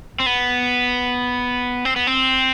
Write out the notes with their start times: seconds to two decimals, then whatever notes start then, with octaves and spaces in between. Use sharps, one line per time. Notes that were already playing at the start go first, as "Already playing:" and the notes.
0.20 C4
0.26 B3
1.85 C4
1.96 B3
2.07 C4